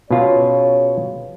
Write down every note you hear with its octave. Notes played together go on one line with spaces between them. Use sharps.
B2 C#4 F4 G#4 C#5